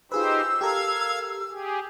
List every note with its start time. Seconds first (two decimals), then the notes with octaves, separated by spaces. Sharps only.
0.12 D#4 F4 G4 G#4 B4 C5 E6
0.61 G4 A4 A#4 F5 G#6
1.51 G4 G#4